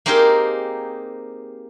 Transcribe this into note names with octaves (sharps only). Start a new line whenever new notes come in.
A#3 C4 D#4 G4 G#4 A#4